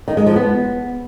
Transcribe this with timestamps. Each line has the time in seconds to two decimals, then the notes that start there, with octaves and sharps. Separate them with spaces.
0.08 D#3
0.17 G#3
0.26 F3
0.36 B3